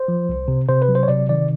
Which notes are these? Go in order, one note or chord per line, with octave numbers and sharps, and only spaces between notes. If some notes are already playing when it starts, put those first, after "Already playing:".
Already playing: C5
F3
C2
C3
C3 C5
B4
F#3
C5
C#5
C3 D5
D#3 D5